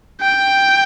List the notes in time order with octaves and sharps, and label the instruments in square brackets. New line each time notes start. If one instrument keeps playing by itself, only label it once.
[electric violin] G5